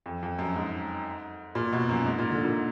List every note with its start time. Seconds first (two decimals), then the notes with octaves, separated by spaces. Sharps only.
0.06 F2
0.23 F2
0.39 F#2
0.56 G#2
1.55 A#2
1.73 B2
1.89 F#2
2.06 G#2
2.19 A#2
2.31 D3
2.44 A#2